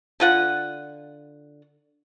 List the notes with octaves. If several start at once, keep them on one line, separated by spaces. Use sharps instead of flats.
D3 F4 F#5